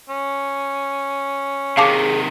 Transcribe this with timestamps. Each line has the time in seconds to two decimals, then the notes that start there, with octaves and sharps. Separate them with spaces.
0.09 C#4
1.77 C3 D#3 G#4 F5 A5 D6